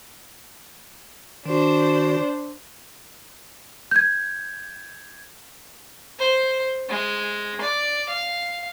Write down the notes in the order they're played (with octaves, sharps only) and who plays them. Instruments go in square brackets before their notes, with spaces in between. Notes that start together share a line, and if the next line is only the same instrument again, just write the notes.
[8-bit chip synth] D#3 F#4 [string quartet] D4 C5
[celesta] G6 G#6
[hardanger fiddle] C5
G#3
D5
F5